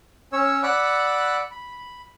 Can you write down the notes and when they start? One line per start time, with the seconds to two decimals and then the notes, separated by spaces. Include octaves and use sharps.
0.33 C#4 C#5 E6
0.63 D5 F#5 B5 D6 E6 F#6
1.51 B5